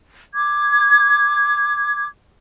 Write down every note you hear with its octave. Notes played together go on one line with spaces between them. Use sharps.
D6 G#6